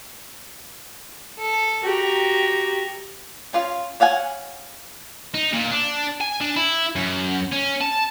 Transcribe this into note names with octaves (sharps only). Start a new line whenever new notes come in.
A4
F#4 G4 A#5
C#4 F4 F5
C#5 F5 F#5 G#5
D#4
A#2
D4
G#5
D4
E4
F#2
C#4
A5